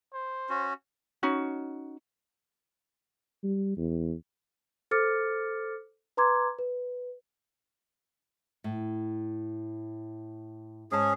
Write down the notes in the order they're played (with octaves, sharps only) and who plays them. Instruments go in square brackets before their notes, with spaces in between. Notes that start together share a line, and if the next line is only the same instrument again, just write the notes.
[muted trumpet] C5
[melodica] C#4 F#4
[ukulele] C#4 D#4 F#4
[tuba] G3
E2
[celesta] A4 C5 D6 F6 A6 C#7
B4 A#5 C6 D6 G#6
B4
[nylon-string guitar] A2
[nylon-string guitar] G#2 C#5 A5 [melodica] C#4 G#4